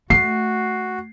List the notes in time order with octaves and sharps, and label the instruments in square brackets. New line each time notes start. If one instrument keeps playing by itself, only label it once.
[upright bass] A3 [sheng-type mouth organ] F#4 [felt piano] C7